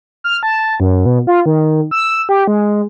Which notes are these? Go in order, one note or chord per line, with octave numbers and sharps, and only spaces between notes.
F6
A5
F#2
B2
F4
D#3
E6
G4
G#3